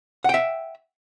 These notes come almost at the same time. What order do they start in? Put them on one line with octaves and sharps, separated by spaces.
F#5 G5 E5